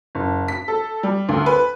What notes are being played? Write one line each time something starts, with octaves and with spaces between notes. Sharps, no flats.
F#1
B6
A4
G3
D2
B4